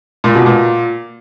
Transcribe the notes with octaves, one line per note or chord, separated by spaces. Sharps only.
A#2
B2
A#2